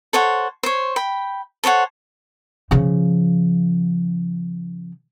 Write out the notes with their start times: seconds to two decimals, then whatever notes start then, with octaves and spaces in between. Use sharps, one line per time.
0.13 A4 C5 C#5 F#5
0.63 C5 C#5
0.96 G5 B5
1.64 A4 C5 C#5 F#5
2.71 C#3 F3